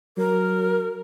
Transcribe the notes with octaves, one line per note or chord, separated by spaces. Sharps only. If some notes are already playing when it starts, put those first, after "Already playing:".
F#3 A#4